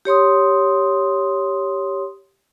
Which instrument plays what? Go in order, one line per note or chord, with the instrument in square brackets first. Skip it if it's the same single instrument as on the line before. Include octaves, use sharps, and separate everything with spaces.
[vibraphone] G4 C#5 C6 D#6